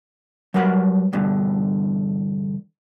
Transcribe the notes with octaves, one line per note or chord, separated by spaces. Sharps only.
F#3 G3 A#4 B4 F#5
E2 G2 B2 D3